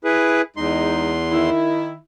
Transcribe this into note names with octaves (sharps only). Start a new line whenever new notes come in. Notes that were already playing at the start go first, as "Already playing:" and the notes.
E4 G#4 B4
E2 G#3 D#4 C6
D#3 E4